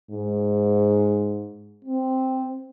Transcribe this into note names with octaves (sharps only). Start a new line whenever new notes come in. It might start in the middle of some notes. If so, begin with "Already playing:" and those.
G#2
C4